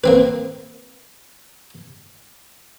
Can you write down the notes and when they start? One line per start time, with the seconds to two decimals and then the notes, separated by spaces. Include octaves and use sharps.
0.04 A#3 C4 B4